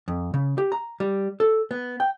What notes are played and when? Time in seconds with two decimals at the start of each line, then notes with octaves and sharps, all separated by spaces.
0.08 F2
0.34 C#3
0.58 G4
0.72 A#5
1.00 G3
1.40 A4
1.71 B3
2.00 G5